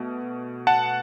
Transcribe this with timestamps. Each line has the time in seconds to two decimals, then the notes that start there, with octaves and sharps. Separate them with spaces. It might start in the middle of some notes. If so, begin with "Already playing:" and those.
Already playing: B2 A3
0.67 F#5 A5